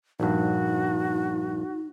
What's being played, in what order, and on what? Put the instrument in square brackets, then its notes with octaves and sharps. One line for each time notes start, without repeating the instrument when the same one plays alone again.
[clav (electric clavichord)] A#1 G2 [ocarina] D#4 [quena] F#4